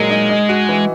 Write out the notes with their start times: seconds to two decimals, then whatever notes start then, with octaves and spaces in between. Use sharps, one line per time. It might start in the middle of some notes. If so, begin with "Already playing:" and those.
Already playing: A#2 F#3 G#3 A#3 D#4
0.10 D#4
0.29 D#4
0.49 F#4
0.69 E3